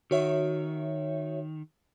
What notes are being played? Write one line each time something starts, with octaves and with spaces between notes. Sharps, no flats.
D#3 F#4 C#5 E5